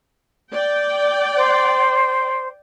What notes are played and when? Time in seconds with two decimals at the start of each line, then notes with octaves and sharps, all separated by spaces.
0.53 D5 G5
1.37 C5